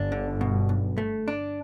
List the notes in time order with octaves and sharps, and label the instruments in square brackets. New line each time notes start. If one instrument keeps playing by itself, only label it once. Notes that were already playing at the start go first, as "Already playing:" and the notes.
Already playing: [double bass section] G1 G2 [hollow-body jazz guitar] D4
[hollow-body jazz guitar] D3
B2
B1
A3
D4